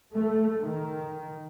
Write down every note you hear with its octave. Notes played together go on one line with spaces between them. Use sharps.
A3
D#3